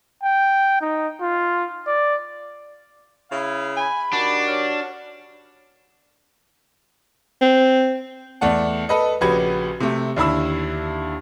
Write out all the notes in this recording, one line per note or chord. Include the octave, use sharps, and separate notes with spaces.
G5
D#4
F4
D5
C#3 E4 F5
G#5 B5
D#3 D4 F#4 G4
C#5 F6
C4
E2 A3 D5 F#5 A5
A4 B4 D#5
A#1 C#3 F#4 G4 B4 G#6
C3 A3
D#2 D3 E4 B5 E6